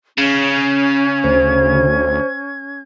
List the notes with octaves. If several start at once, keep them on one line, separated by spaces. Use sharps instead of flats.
C#3 C#4 G#6
D2 C5